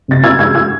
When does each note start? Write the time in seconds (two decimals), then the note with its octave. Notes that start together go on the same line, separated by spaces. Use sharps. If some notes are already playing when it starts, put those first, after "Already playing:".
0.08 C3 A6
0.24 E6 G#6
0.39 G#3 E6 G#6
0.55 E6 G#6